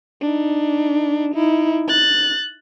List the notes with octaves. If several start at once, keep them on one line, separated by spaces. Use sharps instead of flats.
D4 D#4
D#4 E4
F#6 A6